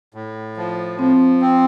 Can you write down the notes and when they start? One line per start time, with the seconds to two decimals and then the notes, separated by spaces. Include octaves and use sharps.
0.14 A2
0.57 F3
0.99 F3 C4
1.42 C4